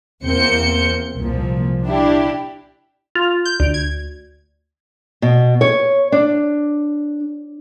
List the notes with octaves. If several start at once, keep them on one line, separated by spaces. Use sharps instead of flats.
E2 A#3 C4 G6 C#7
C2 A#2 F3
D4 E4 G4
F4
G6
D2
G#6
B2
C#5
D4